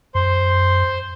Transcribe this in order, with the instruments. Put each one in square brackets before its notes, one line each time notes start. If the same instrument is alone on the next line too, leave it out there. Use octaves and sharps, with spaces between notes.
[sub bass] F#2 [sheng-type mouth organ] C5 C6